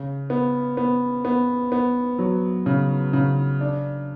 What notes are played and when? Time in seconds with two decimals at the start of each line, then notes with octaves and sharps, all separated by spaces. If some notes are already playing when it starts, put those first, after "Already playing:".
Already playing: C#3
0.30 B3
0.77 B3
1.25 B3
1.72 B3
2.19 F#3
2.66 C#3
3.13 C#3
3.61 D4